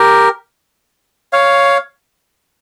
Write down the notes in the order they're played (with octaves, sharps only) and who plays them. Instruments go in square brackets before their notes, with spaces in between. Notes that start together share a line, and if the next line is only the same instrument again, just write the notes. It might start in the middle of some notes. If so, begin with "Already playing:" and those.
Already playing: [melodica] G4 A#4
C#5 F5